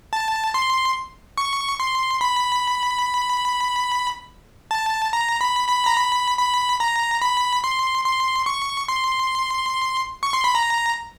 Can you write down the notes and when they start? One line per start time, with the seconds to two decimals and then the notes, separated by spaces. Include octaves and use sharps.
0.13 A5
0.54 C6
1.38 C#6
1.80 C6
2.21 B5
4.71 A5
5.13 A#5
5.41 B5
5.69 B5
5.86 A#5
5.97 B5
6.38 B5
6.80 A#5
7.22 B5
7.64 C6
8.05 C6
8.46 C#6
8.88 C6
10.23 C#6
10.33 C6
10.44 B5
10.55 A#5